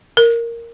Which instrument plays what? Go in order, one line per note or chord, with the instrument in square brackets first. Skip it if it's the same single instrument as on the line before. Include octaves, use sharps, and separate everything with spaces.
[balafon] A#4